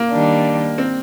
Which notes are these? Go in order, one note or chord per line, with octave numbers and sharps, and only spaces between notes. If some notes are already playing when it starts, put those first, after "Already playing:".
Already playing: A#3
D#3 G3 D4
C4